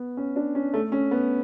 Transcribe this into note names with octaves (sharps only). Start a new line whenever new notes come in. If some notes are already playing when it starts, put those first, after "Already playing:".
Already playing: B3
C#4
D4
C#4
A3
C#4
B3